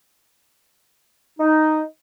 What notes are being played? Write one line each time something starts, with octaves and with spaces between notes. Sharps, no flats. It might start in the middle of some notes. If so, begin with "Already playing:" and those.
D#4